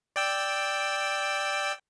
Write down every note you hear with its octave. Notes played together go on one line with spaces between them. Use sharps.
D5 G5 E6